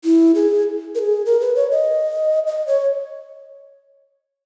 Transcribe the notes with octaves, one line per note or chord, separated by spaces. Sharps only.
E4
G#4
A#4
G#4
A#4
B4
C#5
D#5
D#5
C#5